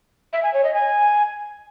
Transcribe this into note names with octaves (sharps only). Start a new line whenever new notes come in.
E5
G#5
C#5
D#5
G#5